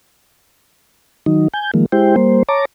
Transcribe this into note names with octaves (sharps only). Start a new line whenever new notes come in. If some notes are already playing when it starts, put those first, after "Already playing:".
D#3 F#3 D#4
G#5 G6
D#3 F3 G#3 A#3
G#3 E4 G4 C5 G5
G3 A#3 C5
C#5 A5 A#5 D6